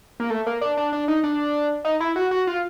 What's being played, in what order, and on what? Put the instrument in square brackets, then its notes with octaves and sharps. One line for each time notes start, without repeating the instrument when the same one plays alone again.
[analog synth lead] A#3
A3
A#3
D4
D4
D4
D#4
D4
D#4
E4
F#4
F#4
F4